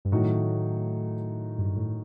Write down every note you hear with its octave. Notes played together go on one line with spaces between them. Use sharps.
G2
A2 D#3 F#3 A3 D#4 F#4
G2
A2